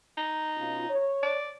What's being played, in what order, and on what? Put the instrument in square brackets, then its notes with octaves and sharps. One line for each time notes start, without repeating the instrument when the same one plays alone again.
[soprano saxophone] D#4
[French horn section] B2 C#4 F4
C#5
[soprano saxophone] D5